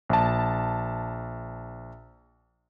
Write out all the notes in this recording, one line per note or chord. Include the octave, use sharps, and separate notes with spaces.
A#1 A5